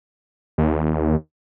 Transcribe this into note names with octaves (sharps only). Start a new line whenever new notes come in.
D#2